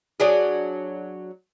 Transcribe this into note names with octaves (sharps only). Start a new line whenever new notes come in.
F#3 D4 G#4